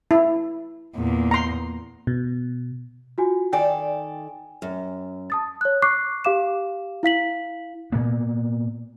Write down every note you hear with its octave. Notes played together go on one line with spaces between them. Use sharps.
E4
E2 A#2
A#5 C6
B2
F4 F#4 G#5
D#3 A4 D5 G5 G#5
F#2
A5 D#6 A6
C#5 F#6
C#6 D6 F#6 C7
G4 F5 D6 E7
E4 F5 B6 F#7
A#2 A#3 B3